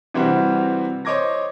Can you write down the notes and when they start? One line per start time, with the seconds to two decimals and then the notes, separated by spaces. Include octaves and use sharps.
0.14 C3 E3 G3 C4 F#4
1.05 C5 C#5 D#5 D6 G#6 A#6